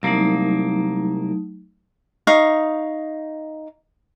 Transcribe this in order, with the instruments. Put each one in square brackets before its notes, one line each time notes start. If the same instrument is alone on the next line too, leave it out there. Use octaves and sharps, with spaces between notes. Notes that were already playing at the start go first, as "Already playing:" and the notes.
[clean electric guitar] C2 A#3 [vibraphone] F#3 A3 D#4
[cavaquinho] D#4 F5 C#6 D#6